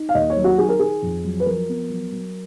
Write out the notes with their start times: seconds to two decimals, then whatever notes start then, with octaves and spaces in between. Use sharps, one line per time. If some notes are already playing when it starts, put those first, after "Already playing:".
Already playing: D#4
0.09 F5
0.15 D#2 D#5
0.30 C#5
0.37 F#3
0.44 F#4
0.58 D#3 G#4
0.69 A#4
0.79 D#3 G#4
1.02 F2
1.24 F#3
1.40 B4
1.46 F3 A#4
1.69 B3
1.90 F#3
2.12 F#3